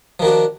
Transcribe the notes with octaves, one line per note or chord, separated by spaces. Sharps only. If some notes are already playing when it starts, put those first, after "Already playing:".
D#3 F3 D4 F#4